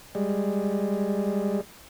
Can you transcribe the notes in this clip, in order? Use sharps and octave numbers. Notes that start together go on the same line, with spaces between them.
G3 G#3